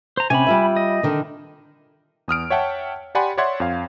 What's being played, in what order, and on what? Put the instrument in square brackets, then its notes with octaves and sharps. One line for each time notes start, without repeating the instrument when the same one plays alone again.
[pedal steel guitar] C5 A#5
[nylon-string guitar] C3 C#4 [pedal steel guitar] G#5 B5
[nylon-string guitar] G3 F4 E5
[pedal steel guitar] D#5
[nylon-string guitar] D3 D#3
[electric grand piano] E2 D#6 F6 D7
C#5 E5 F#5 G5 A5
G4 D5 F#5 G#5 B5 C6
C#5 D5 E5 F#5 C6 G#6
F2 F5